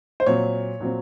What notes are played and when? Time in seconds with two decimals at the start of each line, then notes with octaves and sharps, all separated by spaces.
0.20 C5
0.26 A#2 F#3 C4 C#5
0.80 A#2 F#3 C4